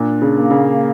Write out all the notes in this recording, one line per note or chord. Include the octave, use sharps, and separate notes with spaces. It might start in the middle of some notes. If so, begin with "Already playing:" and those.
Already playing: A#2 D4
C#3
A#3
C#3